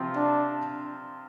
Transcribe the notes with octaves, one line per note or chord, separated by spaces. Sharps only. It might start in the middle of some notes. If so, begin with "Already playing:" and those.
Already playing: C3 F3 C4 F4
D4